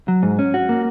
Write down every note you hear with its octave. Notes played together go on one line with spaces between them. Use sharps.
F#3
G#2
C#4
F#4
A#3